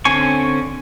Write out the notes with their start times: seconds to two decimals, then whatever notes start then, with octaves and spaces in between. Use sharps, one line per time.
0.05 D3 C4 C#4 G#5 C#6